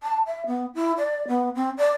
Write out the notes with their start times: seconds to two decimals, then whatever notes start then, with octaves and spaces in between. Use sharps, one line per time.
0.03 A5
0.26 E5
0.46 B3
0.75 E4
0.98 D5
1.28 B3
1.55 C4
1.78 D5